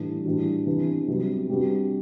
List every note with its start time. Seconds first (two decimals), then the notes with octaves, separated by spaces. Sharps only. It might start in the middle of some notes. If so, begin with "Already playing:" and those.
Already playing: A2 E3 G3 D4
0.25 A2 E3 G3 D4 F#4
0.66 C3 E3 B3 D4
1.08 C2 C3 F#3 B3
1.49 C3 G3 D4 F#4